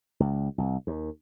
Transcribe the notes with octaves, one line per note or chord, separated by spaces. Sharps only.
C#2
C2
D#2